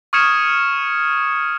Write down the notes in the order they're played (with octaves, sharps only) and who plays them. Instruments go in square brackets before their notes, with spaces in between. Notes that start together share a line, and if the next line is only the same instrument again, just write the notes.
[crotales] C#6 D#6 F6 G#6 C#7 E7